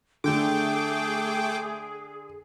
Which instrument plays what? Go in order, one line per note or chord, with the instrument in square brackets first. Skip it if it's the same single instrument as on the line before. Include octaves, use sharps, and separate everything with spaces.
[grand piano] D3 [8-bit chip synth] A3 G5 D6 [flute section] G#4